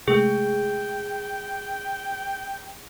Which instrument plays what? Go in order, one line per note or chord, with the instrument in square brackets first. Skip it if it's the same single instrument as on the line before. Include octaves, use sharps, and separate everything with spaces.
[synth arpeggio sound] C3 G#3 A3 [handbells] G#4 [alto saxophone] G5